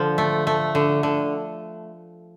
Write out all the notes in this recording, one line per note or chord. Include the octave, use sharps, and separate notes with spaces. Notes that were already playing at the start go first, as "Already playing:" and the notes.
Already playing: D3 F3
A3
A3
D3
D3